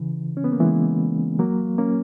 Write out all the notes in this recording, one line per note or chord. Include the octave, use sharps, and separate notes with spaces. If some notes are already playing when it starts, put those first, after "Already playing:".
Already playing: C#3 E3
C#4
B3
A#3
E3 G#3
F#3 A#3
A#3 C#4